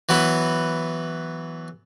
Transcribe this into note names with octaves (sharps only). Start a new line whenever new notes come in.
E3 F#3 B3 E4